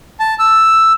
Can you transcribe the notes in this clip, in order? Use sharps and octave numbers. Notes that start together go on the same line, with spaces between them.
A5
E6